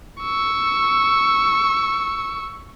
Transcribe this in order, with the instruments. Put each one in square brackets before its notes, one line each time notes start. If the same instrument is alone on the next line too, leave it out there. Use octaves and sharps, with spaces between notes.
[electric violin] C#6 E6